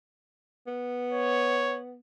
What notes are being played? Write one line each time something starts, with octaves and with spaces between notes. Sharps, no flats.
B3
C#5